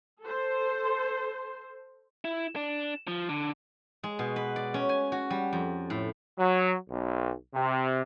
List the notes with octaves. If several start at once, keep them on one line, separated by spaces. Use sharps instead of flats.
A4 C5
E4
D4
F3
D3
G#3
B2
B4
D5
C#4
G#5
F#4
G3
F2
A2
F#3
B1
C3